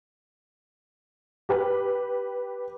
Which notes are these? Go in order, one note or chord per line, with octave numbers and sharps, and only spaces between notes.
G4 B4